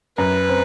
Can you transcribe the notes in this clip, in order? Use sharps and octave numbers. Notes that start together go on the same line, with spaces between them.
F#2 B4
C4